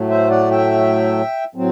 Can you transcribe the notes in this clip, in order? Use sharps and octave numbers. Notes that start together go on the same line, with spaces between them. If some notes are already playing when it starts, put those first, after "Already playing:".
Already playing: A2 F#3 A3
C5 E5
D5 F#5
E5 G5
A2 F#3 C4